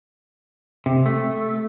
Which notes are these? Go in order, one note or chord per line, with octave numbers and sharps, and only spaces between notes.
C3
A3